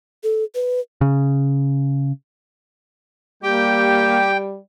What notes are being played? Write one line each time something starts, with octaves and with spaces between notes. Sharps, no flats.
A4
B4
C#3
G3 A#3 G4 G5